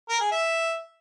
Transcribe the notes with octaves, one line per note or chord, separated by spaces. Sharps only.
A#4
G#4
E5